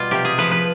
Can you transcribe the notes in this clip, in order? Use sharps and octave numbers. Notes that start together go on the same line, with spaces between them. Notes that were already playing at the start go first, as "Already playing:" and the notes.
Already playing: B2 G3 F4
C3 G4
G#4
F3 B4
B4